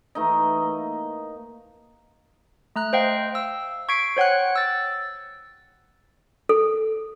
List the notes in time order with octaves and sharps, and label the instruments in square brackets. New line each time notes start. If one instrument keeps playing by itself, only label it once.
[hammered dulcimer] E3 A3 D#4 D#5
A#3
[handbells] A3 A#5 F#6
C5 D#5 F5 G5
E6
C#6 G#6 B6 C7 D7
C5 C#5 F#5 G5 F#6
E6 A6
[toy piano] A4